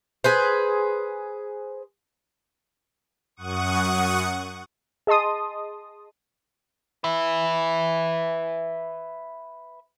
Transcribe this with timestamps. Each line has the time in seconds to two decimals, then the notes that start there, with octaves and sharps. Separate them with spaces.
0.24 G#4 B4 C5
3.36 F#2 F#5 C#6 D#6
5.07 G#4 D#5 A5 C6 D#6
7.04 B4 E5